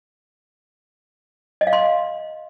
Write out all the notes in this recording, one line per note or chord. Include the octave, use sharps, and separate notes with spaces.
D#5
F5
C6